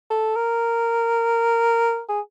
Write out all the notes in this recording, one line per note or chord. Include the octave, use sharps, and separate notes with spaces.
A4
A#4
G#4